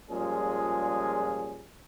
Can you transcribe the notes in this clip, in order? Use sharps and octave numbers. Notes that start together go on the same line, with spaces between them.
A#2 F3 G3 G#3 C#4 G#4